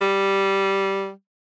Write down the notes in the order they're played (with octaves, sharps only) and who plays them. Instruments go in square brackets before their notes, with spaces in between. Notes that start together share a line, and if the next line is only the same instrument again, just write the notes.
[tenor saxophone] G3